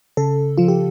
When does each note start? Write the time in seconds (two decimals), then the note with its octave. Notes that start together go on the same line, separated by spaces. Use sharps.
0.17 C#3 A4
0.58 F3 F4
0.68 G4